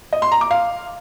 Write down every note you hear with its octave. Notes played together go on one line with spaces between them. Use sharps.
D#5
C6
A#5
D6
F5